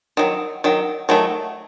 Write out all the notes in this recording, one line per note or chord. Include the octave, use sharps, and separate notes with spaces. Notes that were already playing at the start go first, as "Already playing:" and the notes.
D#3 F#3
D#3 F#3
D#3 F#3 A3